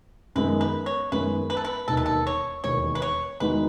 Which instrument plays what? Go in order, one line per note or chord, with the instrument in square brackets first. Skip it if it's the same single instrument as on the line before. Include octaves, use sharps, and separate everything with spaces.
[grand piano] F#2 D#3 G#3 B3 [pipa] B4
[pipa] B4
C#5
[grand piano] F#2 D#3 G#3 B3 [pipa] B4
[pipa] B4
A4
B4
[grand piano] E1 D#2 D#3 [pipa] A4
[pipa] B4
A4
C#5
[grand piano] E1 D#2 D#3 [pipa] C#5
[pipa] B4
C#5
[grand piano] E2 D#3 G#3 D#4 F#4 [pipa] B4